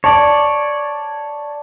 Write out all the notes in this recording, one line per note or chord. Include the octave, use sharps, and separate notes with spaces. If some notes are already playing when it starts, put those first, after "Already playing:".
C#5 D5 A5